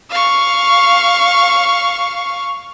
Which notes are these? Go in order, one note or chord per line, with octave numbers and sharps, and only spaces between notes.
F5 C#6